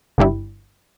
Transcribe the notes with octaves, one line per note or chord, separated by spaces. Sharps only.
G1 G2 G3 E4